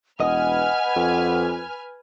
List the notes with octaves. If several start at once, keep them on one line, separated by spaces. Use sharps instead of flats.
E1 B4 D#5 F#5 G#5 F6
F2